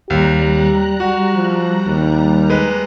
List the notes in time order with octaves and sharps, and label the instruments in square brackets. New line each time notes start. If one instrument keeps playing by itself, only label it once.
[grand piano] D#2 [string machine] G3 A#5 F#6 [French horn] G4
[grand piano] F#4
[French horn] F3
D#2
[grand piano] G#3 B4